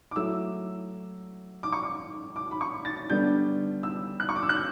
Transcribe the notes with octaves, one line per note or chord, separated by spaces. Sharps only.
D6
F#3 A3 E4 E6
D6
C#6
D6
D6
B5
C#6
A6
D3 G3 B3 D4 G6
E6
F#6
C#6
D6
E6
F#6
G6